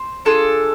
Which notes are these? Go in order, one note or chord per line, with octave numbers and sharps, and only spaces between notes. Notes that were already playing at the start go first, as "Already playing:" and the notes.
Already playing: C5
D4 F4 G#4 A4